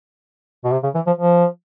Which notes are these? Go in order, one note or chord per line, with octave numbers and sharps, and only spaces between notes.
B2
C3
C#3
E3
F3
F3